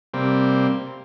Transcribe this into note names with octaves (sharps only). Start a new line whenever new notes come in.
C3 G3 A#3 C4